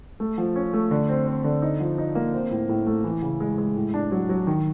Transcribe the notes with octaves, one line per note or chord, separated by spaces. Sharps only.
A3
F3
C#4
A3
D3
C4
C4
D3
D#4
F3
D#4
A#3
C4
A2
A2
A3
E3
C#3
G#3
G#3
A2
D4
F#3
F#3
D#3